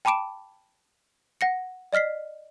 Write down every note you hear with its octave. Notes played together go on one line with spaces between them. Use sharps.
G5 A5 B5 D6 D7 E7
F#5 A#6 C#7
D5 D#5 F6 B6 C7